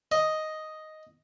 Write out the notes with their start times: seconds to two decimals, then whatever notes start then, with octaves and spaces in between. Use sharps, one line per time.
0.12 D#5